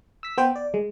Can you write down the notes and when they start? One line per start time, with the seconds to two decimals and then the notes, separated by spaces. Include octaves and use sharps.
0.23 E6 B6
0.38 B3 C5 G5
0.56 D5
0.74 G#3